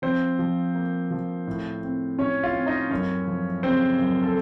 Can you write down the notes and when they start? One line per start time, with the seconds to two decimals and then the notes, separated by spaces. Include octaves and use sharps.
0.02 F3 C4 C5
0.39 F3
0.75 A#3
1.11 F3
1.47 A2
1.83 C4
2.19 A2 C#4 C#5
2.43 F4 F5
2.55 C4
2.66 D#4 D#5
2.91 F#2 C#4 C#5
3.27 F3
3.62 C#3 C4 C5
3.99 F#2
4.23 A4